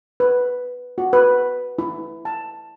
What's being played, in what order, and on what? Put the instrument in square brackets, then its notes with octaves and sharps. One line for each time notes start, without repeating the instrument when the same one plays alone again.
[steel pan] B4
F#4
B4
E4
A5